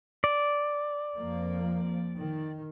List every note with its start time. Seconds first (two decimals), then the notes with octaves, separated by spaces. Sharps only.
0.24 D5
1.16 F2 F3 A#3
2.16 D#3